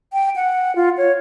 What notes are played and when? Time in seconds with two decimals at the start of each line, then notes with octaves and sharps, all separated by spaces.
0.13 G5
0.36 F#5
0.76 F4
0.98 C#5